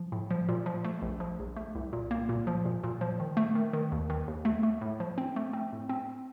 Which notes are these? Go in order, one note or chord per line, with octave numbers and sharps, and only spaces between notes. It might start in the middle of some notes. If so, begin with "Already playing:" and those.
Already playing: F3
A2
F3
A#2
F3
A3
A#1
F3
A#1
A3
C2
A#2
A#3
A#2
F3
A#2
A#2
F3
D#3
A3
D#3
D#3
D#2
D#3
D#2
A3
A3
A2
F3
C4
A3
C4
A2
C4